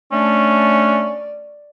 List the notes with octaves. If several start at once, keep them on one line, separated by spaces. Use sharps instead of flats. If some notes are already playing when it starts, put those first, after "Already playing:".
A3 C#4 D4 D5